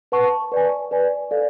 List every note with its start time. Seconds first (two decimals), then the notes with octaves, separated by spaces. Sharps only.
0.12 B4 F#5 A5 C#6
0.52 B4 D5 G#5
0.91 B4 D5 G#5
1.31 A4 D5 F5